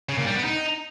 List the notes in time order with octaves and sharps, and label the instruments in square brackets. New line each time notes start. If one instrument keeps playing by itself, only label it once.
[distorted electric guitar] C#3
A#2
G3
B3
D#4